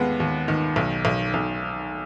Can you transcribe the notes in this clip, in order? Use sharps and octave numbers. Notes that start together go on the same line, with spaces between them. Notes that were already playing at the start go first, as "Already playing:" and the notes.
Already playing: D#2 G#3 B3
D#2
D#3
B1
B1
B1